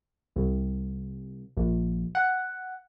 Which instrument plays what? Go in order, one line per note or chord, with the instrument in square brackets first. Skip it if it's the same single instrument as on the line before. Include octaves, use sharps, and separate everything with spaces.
[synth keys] C2
A#1
F#5